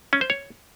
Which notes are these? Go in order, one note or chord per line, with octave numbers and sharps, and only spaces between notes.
C#4
C5
C#5